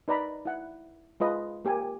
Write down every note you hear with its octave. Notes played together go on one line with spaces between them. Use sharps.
D#4 B4 D5 A#5 B5
E4 F#5
G#3 F4 B4 D#5
A#3 G4 A#4 G#5